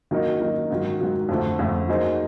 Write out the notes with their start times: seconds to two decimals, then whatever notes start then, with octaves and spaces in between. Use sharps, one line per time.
0.11 D#3 F#3 A#3 D#4 F#4
0.40 D#3 F#3 A#3 D#4 F#4
0.70 G#2 D#3 F#3
1.00 G#2 D#3 F#3
1.29 F2 D3 F3 A3
1.59 F2 D3 F3 A3
1.88 F#3 A#3 D#4 G#4 C5